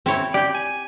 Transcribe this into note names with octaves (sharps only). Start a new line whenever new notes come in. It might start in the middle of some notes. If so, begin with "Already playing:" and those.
C4 E4 C#5
G4 D5 G5
G#5